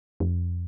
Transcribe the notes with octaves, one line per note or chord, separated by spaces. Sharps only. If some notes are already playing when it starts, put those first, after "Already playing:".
F2